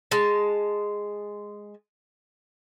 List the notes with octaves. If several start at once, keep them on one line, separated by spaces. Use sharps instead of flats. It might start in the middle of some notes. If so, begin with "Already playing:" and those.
G#3 A5